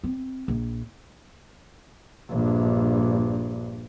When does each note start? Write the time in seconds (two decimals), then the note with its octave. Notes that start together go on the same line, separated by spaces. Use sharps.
0.04 C4
0.48 A#1
2.30 A#1 G2